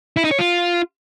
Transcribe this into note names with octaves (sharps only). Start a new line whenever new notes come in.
E4
D#4
C#5
F4